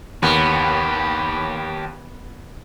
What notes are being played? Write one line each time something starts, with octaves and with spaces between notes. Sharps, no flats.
D#2 B3 G4 A#4 C#5 B5